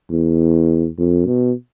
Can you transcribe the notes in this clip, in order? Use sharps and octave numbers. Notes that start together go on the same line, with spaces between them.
E2
F2
B2